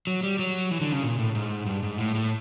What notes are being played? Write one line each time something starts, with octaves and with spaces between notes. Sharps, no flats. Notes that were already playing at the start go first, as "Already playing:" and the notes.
F#3
G3
F#3
E3
D3
C#3
A#2
A2
G#2
G2
G#2
A2
A2